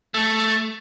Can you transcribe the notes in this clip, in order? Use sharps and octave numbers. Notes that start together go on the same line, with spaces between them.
A3